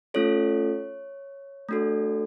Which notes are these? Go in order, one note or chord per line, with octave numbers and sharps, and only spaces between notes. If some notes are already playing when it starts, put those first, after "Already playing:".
A3 C#4 F4 A4 C#5
A3 D4 F#4 A4